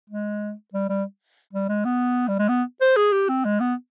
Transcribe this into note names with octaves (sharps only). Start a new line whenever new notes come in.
G#3
G3
G3
G3
G#3
B3
G3
G#3
B3
C5
G#4
G4
C4
G#3
B3